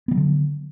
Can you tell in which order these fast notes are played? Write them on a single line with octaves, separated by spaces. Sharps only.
B3 D#3 F#3 D3